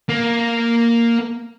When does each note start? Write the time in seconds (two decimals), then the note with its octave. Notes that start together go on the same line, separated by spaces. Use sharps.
0.09 A#3